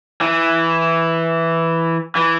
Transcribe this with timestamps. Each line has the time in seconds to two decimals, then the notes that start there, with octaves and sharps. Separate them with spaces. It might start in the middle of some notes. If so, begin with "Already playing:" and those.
0.22 E3
2.17 E3